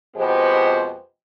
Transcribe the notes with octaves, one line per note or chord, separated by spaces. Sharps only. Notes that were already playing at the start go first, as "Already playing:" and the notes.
F2 B2 G#3 B3 G4 C5